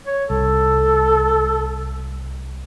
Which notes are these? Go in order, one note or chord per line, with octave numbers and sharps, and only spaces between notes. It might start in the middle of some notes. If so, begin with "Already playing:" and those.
C#5
C2 A4